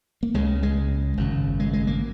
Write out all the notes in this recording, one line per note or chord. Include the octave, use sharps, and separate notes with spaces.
A#3
C#2 C#3 G#3
G#3
G#1 F#2 C#3
G#3
G#3
A#3